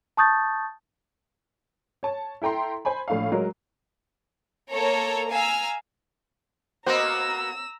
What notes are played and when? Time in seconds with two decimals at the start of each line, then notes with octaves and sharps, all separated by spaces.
0.17 A5 C#6 D#6 G6 A6
2.03 C#5 A5
2.42 E4 A4 G5 A#5 C6
2.85 C5 G#5 B5
3.08 A#1 A2 F5
3.32 F#3 G#3 A#4
4.70 A#3 A4 C#5 A#5
5.30 F5 G#5 A#5 E6 F6
6.86 A#3 B3 F#4 C5 D#5 A#5 E6